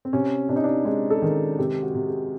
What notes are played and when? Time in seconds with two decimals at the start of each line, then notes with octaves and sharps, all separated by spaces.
0.05 C4
0.13 C3 C#4
0.49 C3 D4
0.56 D#4
0.64 D4
0.85 G#3 D#4
1.10 A4
1.22 D#3 G#4
1.58 C3 G4
1.82 F#4
1.95 C3
2.07 G#4